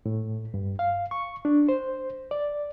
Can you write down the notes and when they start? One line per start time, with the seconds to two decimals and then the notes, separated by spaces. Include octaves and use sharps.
0.06 A2
0.54 G2
0.79 F5
1.11 C#6
1.45 D4
1.69 C5
2.31 D5